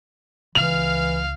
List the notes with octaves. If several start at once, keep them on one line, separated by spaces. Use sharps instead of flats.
C#2 E3 F5 F6 F7